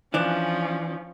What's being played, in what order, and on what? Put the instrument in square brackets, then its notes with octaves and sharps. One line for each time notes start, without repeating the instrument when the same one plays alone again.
[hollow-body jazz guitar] E3 D4 [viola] F3 C#4